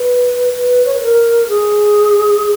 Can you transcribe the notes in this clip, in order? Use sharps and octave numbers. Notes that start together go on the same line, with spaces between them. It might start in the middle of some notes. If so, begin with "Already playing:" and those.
Already playing: B4
B4
C#5
B4
A#4
G#4